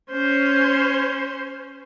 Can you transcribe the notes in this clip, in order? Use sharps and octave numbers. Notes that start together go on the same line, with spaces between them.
C#4 C5